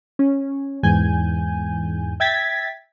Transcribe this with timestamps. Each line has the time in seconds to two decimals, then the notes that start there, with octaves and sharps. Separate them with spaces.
0.19 C#4
0.83 E2 G#2 G#5 G6
2.20 E5 G5 G#6 A6 B6